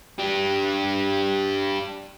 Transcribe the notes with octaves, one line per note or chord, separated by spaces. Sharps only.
D4 G4